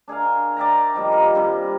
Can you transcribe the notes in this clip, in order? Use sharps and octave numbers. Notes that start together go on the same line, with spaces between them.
D4 G#4 A#4 F5
D5 E5 G5 A#5
D#3 F3 G3 A#3
A#4
G2 C3 G3